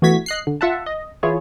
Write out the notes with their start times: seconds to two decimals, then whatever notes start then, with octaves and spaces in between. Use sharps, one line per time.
0.02 E3 A3 B3 F#4 G#6 B6
0.26 D#5 F#6 C7
0.47 D3
0.61 F4 E5 F#5 A5
0.86 D#5
1.23 E3 E4 F4 G#4 C#5